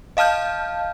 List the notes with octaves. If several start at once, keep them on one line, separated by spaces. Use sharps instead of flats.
D#5 F5 A5 F6 G6